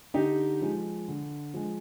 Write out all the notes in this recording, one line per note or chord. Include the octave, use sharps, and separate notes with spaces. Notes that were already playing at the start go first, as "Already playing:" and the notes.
D3 D#4 G4
F3 G#3
D3
F3 G#3